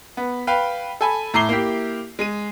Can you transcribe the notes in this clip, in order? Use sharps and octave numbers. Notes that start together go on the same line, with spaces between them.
B3
B4 F5 G5
A4 G#5 B5
A2 A#5 D6 C7 G7
A#3 E4 G4
G#3 D#7